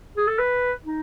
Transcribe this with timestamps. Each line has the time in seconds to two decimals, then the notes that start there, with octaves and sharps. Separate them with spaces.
0.17 G#4
0.27 A4
0.39 B4
0.86 D#4